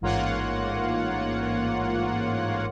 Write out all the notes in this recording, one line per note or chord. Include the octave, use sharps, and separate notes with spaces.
A1 G#2 A#3 F4 C#5 F#5